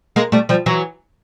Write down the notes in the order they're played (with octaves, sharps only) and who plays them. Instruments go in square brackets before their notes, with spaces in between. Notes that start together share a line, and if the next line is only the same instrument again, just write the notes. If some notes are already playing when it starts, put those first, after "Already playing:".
[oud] G#3 A#3
G3 A3
F3 G3
E3 F#3